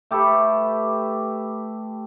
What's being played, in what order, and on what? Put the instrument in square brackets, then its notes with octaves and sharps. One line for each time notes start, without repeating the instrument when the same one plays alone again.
[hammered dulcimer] A3 G4 A4 B4